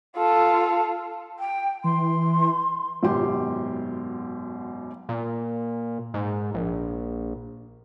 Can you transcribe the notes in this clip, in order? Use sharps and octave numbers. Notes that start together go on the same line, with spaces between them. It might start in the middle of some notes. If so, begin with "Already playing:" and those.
F4 A4
G5
E3 C6
G#1 F#2 B2 G4 G5 C6
A#2
G#2
A#1